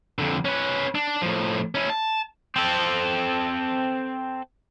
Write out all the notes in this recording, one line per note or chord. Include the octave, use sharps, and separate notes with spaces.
F2 D3
C#4 B4
D4
A2 F3
C#4 E4
A5
C4 A4